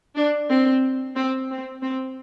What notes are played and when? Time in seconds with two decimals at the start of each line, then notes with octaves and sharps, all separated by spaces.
0.16 D4
0.49 C4
1.15 C4
1.49 C4
1.82 C4